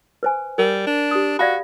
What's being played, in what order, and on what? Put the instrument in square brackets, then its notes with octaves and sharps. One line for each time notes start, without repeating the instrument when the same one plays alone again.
[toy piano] B4 C5 G#5
[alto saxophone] G3 [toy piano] A#4
[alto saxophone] D4
[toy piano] G4 D#6
[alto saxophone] F#4 [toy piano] D5 F5 B5